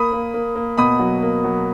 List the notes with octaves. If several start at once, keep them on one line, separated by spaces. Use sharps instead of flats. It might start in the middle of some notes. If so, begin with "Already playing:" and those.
Already playing: A#3 B5 D#6
A#3
A#3
A#3
B2 B5 D#6
F#3
A#3
F#3